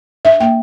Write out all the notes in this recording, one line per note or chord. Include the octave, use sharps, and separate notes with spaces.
D4 E5
A#3 G5